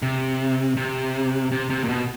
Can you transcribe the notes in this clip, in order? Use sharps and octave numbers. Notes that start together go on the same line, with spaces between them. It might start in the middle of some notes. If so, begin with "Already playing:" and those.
C3
C3
C3
C3
A#2
B2